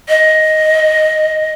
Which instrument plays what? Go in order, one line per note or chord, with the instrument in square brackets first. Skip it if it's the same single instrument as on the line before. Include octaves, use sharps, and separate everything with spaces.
[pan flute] D#5